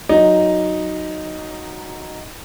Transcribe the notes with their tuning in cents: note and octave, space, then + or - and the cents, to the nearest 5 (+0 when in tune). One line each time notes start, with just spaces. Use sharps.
F#3 +0 D#4 +0